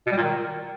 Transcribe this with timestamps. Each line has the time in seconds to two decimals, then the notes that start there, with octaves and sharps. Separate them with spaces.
0.07 B2
0.12 G3
0.17 A#2
0.22 D#3